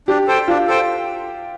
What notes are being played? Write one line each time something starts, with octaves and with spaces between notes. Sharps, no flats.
D4 G4
A4 C5 G5
D4 F4
A4 C5 G5